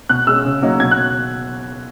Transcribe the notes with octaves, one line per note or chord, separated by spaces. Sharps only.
B2 F#6
G#3 C#4 E6
C#3
F#3 A#3 D#4
B2 G#6
F#6